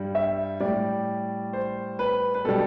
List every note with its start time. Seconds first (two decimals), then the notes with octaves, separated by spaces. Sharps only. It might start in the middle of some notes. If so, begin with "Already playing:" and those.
Already playing: G2 G3
0.15 E5
0.60 A2 G3 D5
1.53 C5
1.99 B4
2.35 B4
2.45 B2 G3 A4